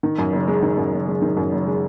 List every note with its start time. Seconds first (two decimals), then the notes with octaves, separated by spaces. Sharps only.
0.03 D#3
0.18 F#2
0.33 F#1
0.48 G#3
0.62 D#3
0.77 F#2
0.92 F#1
1.08 G#3
1.22 D#3
1.37 F#2
1.52 F#1
1.66 G#3